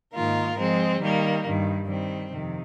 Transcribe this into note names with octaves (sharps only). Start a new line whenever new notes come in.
G#2 D#3 A#3 F4 A#4
F3 G#3 C4
D#3 G3 A#3
G2 D#3 G3
D#3 G3 C4
F2 C3 D#3